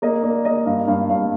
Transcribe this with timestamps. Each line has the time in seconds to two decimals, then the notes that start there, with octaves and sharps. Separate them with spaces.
0.02 A#3 D#5
0.23 A#3 D5
0.45 A#3 D#5
0.66 G2 F5
0.87 G2 F5
1.09 G2 F5